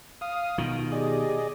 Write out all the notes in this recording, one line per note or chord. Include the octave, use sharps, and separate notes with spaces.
F5 D#6
B2 D#3 F4
G4 G#4 D5 D#5